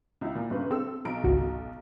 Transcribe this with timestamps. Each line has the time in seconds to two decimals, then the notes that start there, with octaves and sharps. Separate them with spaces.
0.21 C#2 E4
0.35 A#2
0.50 G1 C#3 B4
0.71 C4 A4 E6
1.05 B1 A#5 D7
1.24 G#1 C#2 F#4